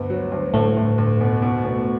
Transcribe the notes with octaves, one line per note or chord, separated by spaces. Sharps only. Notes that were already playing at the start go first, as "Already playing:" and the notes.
Already playing: D2 G2 B3
F#3
D2
D2 A2 A3
D2
D2
B2
B2
B2